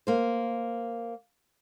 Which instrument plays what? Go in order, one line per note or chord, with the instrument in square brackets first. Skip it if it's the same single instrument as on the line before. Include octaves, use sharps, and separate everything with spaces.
[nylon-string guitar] A#3 C5